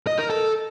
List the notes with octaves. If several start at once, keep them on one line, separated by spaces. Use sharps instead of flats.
D#5
A#4
A4